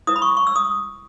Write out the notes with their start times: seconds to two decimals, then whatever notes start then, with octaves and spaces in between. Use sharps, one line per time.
0.07 E4 B4 D#6
0.16 B5
0.22 C#6
0.37 C#6
0.47 E6
0.56 D#6